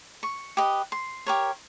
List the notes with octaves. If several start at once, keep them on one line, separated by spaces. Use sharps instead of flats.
C#6
G4 B4 D#5
C6
G4 A#4 C#5